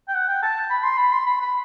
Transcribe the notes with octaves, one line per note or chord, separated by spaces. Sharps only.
G5
F#5
G5
A5
B5
C6
B5
C6
B5
B5